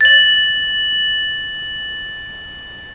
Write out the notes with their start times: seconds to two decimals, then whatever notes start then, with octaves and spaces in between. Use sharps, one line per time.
0.01 A6 F#7